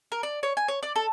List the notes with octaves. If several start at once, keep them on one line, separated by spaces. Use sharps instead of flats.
A#4
D5
C#5
G#5
C#5
D5
A4